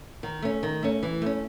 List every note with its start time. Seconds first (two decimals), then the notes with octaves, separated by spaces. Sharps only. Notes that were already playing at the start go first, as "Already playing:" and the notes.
0.23 D#3
0.42 A3 C#4
0.63 D#3
0.83 A3 C#4
1.03 E3
1.22 A3 C#4